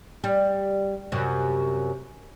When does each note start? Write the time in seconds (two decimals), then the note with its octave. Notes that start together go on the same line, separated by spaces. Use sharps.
0.24 G3
1.12 F#2 C3